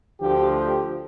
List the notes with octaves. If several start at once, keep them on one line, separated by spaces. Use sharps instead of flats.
D2 D3 F3 G4
G4